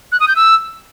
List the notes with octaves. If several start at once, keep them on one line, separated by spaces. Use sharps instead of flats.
F#6
D#6
G6
E6